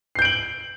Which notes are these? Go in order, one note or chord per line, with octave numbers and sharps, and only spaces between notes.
G6 C7 D7 F#7